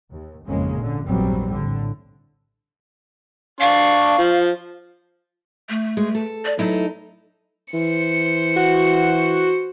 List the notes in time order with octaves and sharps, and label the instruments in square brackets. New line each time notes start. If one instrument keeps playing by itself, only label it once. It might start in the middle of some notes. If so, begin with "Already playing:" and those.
[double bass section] D#2
G#1 F2 C#3 G#3 A#3 C#4
A#2 D3
A#1 E2 G2 F#3 G3 C4
A2 D3
[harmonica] D4 C#6 [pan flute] F5
[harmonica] F3
[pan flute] A3
[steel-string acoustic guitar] G#3
A4
[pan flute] D5
[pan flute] F#3 [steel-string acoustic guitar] A3 D#4 E4
[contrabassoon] E3 [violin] C5 C#7
[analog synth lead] F#4